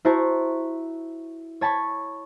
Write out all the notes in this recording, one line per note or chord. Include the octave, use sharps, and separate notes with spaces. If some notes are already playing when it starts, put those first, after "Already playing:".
E4 F#4 C5 A5 A#5 C#6
C#5 A5 B5 C#6